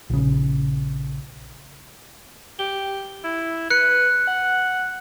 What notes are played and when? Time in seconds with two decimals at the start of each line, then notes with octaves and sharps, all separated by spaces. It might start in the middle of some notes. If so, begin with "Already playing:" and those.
0.10 A#1 C#3
2.59 G4 G7
3.24 E4
3.71 B4 F#6 C#7
4.28 F#5